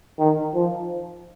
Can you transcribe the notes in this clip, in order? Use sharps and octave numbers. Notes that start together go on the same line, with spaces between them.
D#3
F3